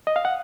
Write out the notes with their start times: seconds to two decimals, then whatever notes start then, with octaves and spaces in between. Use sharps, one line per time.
0.07 D#5
0.16 F5
0.25 F#5